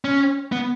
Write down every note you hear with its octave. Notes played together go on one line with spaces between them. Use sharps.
C#4
B3